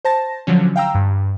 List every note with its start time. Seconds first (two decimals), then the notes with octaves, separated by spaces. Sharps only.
0.05 C5 A5 A#6
0.47 D3 F3 F#3 C#4
0.76 F5 G5 A#5 E6
0.95 G2